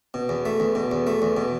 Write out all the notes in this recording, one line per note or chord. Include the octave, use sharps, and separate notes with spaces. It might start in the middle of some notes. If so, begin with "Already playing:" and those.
B2
E2
A3
E2
B2
E2
A3
E2
B2